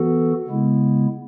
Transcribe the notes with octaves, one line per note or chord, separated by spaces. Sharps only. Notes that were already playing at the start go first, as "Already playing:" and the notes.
Already playing: E3 B3 F#4 A4
C#3 G#3 B3 E4